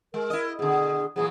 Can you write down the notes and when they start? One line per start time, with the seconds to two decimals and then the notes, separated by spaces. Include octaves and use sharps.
0.14 G#3 A#4
0.30 E4 D#5
0.59 B2 D3 G#4
1.16 A#2 E3 F#3 G#4